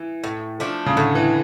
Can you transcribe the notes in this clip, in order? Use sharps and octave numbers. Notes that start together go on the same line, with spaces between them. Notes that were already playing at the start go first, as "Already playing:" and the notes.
Already playing: E3
A2
F3 A3 D4
C#3
A2 D3
E3